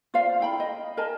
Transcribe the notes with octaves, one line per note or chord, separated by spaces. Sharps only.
F4 C5 D5 F5
E4 G5 B5
D#5
A#4 D#5 G#5 A5